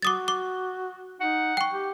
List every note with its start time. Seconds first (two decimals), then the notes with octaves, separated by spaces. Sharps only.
0.02 F#4 D6 D#6 A6
0.28 D6
1.21 D#4 F#5
1.57 G5 C#6
1.72 G4